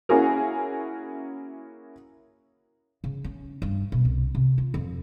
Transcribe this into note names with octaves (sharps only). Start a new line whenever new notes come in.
A#3 C#4 E4 F#4 G#4 A#4
C#3
C#4
G2
B2
C2
C3
F4
F2